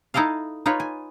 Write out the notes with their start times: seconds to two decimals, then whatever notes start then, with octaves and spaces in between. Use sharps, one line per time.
0.14 D#4 E4 A4 D#5 F5
0.66 D#4 F4 B4 C#5
0.80 G#5